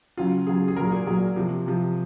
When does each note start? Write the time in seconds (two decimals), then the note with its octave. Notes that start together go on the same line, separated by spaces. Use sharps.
0.17 C#3 F#3 F4
0.47 C#3 F#3 G#4
0.68 G#4
0.76 A#2 F#3 A#4
0.92 G#4
1.07 A#2 F#3 G#4
1.36 C3 F3
1.66 C3 F3